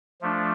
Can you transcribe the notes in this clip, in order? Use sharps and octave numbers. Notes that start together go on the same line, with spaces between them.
F3 A3 D4